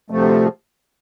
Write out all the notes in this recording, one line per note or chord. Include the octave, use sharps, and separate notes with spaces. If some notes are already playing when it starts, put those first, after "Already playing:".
D2 C3 F3 A3